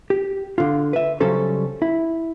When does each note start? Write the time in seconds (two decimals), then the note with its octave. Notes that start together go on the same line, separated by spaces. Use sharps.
0.10 G4
0.58 D3 F4
0.93 B4 E5
1.20 C#3 F#3 G3 C#4 A4 C5
1.82 E4